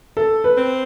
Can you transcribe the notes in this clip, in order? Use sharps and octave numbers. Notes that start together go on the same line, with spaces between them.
A4
B4
C4